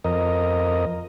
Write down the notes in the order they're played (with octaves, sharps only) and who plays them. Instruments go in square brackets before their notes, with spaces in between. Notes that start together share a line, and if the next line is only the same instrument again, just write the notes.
[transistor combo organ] F2 A#4 D#5